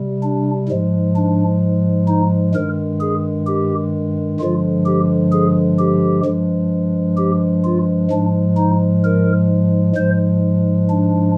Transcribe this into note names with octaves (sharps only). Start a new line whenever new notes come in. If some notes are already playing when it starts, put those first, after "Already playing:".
Already playing: C3 G3
D4
G#2 F3 G#3
D4
D#4
G2 D#3 G#3 A#4
G#4
G4
G2 D3 F3 G#3 F4
G4
G#4
G4
G2 F3 G#3
G4
F4
G#2 F3 G#3 D4
D#4
A#4
G#2 F3 G#3 C5
D4